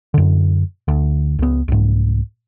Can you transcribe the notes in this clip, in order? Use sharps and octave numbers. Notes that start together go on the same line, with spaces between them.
F#2 D3
D2
C#2 B3
C2 G#2